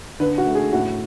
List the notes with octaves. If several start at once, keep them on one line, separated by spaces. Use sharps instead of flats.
D3 B4
F#4
A3
G#4
A2 F#4